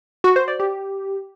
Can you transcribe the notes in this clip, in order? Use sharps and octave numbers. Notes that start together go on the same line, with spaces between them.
F#4
C5
D5
G4